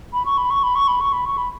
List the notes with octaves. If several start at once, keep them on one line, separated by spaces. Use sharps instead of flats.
B5
C#6
B5
C#6
B5
C#6
B5
C#6
B5
C#6
B5